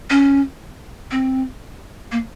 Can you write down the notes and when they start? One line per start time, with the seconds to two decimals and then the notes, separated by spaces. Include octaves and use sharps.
0.10 C#4
1.11 C4
2.12 A#3